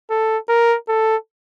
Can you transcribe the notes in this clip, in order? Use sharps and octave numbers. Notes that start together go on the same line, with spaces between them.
A4
A#4
A4